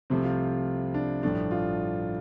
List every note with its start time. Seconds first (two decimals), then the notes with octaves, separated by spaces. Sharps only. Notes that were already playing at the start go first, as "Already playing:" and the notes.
0.10 C2 C3 F3 A3 C4
0.24 F4
0.94 D4
1.23 A1 G2 F3 A3 D4
1.51 F4